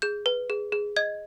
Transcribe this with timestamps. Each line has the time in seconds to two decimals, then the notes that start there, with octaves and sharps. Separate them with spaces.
0.02 G#4 G6
0.26 B4
0.50 G#4
0.72 G#4
0.96 D#5 G#6